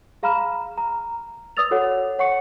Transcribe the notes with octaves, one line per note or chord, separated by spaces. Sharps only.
G#4 F5 A#5 B5 F6 E7
A#5
B4 D5 D#6 E6 A6 F7
F#4 A4 C#5 F#5
C#5 F#5 C#6 C#7